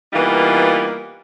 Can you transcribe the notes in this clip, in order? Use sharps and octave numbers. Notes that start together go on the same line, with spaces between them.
E3 G3 A#3 B3 D#4 F4